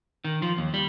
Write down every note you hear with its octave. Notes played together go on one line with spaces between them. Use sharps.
D#3
F3
D#2
G3